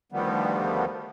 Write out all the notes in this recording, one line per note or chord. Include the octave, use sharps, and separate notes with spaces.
D2 D3 D#3 F3 G3 B3